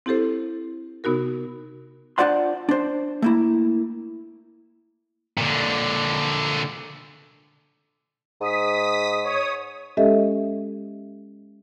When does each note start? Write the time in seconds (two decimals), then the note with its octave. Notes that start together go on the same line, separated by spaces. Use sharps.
0.06 C4 E4 G4 A4 C5
1.04 C3 B3 D#4 F#4 A#4
2.18 D4 F4 C5 D5 F#5 C6
2.69 D4 C5
3.22 A3 A#3 E4
5.38 A#2 D3
8.41 G#2 D#6 B6
9.24 C#5 D#6
9.97 G#3 C#4 G4 A4 D#5 E5